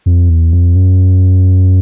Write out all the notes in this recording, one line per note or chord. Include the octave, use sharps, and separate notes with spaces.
F2
E2
F2
F#2